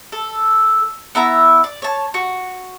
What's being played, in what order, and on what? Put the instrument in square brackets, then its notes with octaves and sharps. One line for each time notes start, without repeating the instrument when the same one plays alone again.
[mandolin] A4
B3 E4 E5 A#5
D5
C#5 A5
F#4